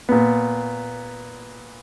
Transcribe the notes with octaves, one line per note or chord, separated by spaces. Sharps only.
A#2 B3